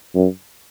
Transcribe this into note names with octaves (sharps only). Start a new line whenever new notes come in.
F#2